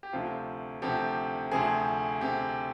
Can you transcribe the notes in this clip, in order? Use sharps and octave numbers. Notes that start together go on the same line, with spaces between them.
G4
D2 C3 F3 F4
D2 C3 F3 G4
D2 C3 F3 G#4
C3 G4